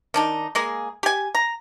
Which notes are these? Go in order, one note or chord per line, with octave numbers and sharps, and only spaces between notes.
D#3 D4 D#4
G#3 A#3 G#4
G4 G#5
A#5